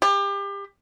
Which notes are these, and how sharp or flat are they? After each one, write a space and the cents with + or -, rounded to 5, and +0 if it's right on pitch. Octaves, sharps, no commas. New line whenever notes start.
G4 +30